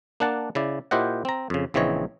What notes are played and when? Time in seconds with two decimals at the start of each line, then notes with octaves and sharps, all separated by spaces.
0.20 A#3 D4 F#5 A5
0.55 C#3 E4 D5
0.91 A#2 E4 G4 C5 D#5 F#5
1.25 C4 A#5
1.50 F2 C#3
1.74 A#1 C#3 E3 C4 C#5 D#5